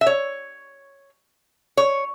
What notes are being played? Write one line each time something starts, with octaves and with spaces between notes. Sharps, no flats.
E5
C#5
C#5